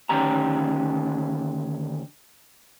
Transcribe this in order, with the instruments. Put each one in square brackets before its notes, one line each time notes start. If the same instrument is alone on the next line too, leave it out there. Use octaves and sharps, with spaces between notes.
[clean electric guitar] D2 D#3 C#4 D4 G4 A#5